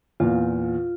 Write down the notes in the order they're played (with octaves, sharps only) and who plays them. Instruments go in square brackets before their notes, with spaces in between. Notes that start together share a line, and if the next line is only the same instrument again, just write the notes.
[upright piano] E2 A#2 [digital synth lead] F4